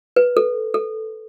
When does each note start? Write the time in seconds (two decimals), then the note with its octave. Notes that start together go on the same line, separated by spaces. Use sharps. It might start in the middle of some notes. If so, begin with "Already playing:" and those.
0.16 B4
0.37 A4
0.74 A4